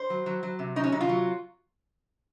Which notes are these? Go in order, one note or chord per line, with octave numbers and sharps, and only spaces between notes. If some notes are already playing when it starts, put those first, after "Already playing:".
Already playing: C5
F#3
F#3
F#3
C3
F#3 D#4
C#4
C3 D#4
F4
F#3